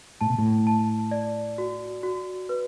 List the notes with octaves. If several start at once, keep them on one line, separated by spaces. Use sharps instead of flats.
A2 A5
B2
A2
A5
D5
F#4
F#4
B4